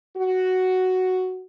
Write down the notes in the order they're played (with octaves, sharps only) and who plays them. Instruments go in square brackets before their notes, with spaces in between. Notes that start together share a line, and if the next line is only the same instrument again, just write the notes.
[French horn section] F#4